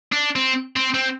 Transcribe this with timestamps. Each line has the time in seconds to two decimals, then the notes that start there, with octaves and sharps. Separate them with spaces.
0.12 D4
0.36 C4
0.76 C4
0.94 C4